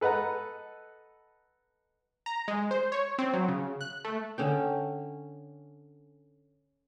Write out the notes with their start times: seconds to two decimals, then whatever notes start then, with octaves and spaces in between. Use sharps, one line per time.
0.01 A4 B4 D#5 F#5 A#5
2.26 A#5
2.48 G#3
2.71 C5
2.92 C#5
3.18 C4
3.33 F#3
3.48 C#3
3.81 F#6
4.05 A3
4.38 D3 C#4 G5